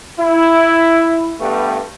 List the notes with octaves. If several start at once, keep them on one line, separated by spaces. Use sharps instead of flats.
E4
G2 G3 A3 B3